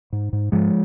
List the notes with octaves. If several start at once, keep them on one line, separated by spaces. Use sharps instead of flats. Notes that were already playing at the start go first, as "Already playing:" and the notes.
G#2
G#2
G#2 F3 G#3